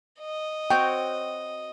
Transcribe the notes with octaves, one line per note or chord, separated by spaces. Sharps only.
D#5
C4 F#4 C#5 G5